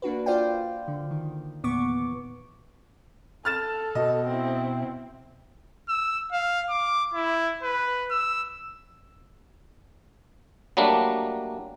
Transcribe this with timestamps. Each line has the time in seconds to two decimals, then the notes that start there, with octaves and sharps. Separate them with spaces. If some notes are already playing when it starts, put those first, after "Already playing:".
0.02 A#3 D4 F#4 B4
0.26 F4 C5 D5 F5 G5
0.88 D3
1.11 D#3
1.63 E2 A#2 B3 C#6 D6
3.45 A4 F6 A6 E7
3.95 B2 D#5
4.27 C4 E4
5.89 E6
6.33 F5
6.69 D6
7.14 E4
7.63 B4
8.11 E6
10.77 F#3 G3 A3 A#3 D4